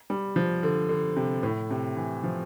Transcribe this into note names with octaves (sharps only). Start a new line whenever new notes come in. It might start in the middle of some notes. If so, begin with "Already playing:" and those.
G3
F3
D3
D3
C3
A2
C3
E3
F3